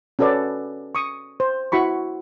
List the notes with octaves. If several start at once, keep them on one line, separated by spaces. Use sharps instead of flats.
C#4 F#4 A4 B4 D5
C#6 D#6
C5
E4 F#4 B5 C#6